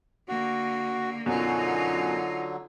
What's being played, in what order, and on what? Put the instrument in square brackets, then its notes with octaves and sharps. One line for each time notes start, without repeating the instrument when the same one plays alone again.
[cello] D3 A#3 [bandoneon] F#4
[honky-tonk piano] F#2 B2 F#4 [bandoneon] D3 F#3 [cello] D#4 F4